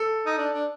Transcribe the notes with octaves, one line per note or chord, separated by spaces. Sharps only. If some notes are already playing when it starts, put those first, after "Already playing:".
Already playing: A4
D#4
D4
D4